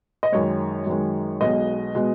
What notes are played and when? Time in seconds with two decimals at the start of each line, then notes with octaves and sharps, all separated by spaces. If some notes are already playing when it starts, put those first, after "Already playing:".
0.23 D#5
0.32 F#2 D#3 G#3 C#5
0.86 F#2 D#3 G#3
1.41 B1 B2 G#3 D#5
1.95 B2 G#3